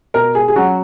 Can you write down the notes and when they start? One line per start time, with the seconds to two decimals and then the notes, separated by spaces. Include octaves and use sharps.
0.14 B2 A#4
0.35 G#4
0.48 G#4
0.56 F#3 C#4 F#4